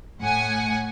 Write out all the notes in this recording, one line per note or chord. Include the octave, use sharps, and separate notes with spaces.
A2 F#5 G#5